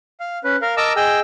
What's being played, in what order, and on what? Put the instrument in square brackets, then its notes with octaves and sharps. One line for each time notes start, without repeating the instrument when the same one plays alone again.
[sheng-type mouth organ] F5
C#4 B4
A#4 F5
A#4 D#5 A5 A#5 D6 E6
G#4 D#5 G5 E6